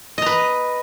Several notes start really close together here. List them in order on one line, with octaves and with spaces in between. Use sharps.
D#5 A#5 B4